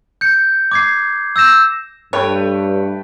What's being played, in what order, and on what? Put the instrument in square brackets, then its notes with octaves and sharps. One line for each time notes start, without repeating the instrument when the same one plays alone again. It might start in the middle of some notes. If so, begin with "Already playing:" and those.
[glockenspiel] G6 C#7
D6 G#6 C7
E6 G6 A#6 E7
[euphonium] G2 [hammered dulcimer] A3 B4 G5 [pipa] C#5